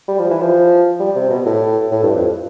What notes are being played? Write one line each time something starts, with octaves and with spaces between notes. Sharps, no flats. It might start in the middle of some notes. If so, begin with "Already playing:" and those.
G3
F3
E3
F3
G3
C3
B2
A2
A2
G2
F2